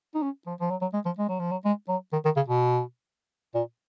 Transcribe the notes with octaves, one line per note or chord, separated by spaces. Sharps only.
D#4
C#4
F3
F3
F#3
F#3
G#3
F3
G#3
F#3
F3
F#3
G#3
F#3
D#3
D#3
C#3
B2
A#2